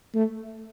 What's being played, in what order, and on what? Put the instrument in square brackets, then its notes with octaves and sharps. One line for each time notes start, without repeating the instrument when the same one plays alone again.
[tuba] A3